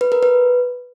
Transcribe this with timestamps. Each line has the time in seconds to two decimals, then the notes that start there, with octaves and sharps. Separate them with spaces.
0.01 B4
0.12 A#4
0.23 B4